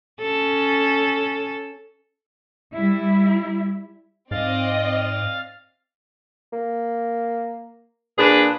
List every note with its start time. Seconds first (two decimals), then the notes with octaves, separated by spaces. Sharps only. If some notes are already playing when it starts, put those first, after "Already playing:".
0.21 C#4 A4
2.75 G3 E4
4.31 G#2 C4 D5 D#5 F5 A6
6.52 A#3
8.17 A#2 D4 G#4 B4